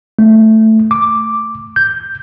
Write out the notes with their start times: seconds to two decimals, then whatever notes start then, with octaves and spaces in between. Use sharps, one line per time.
0.19 A3
0.91 D6
1.76 G6